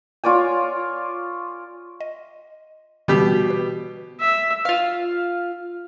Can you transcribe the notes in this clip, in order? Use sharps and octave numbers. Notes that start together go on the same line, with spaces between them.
F4 C#5 D5 G#5
D#5
B2 D3 E3 G3 G4
B4
E5
F4 F5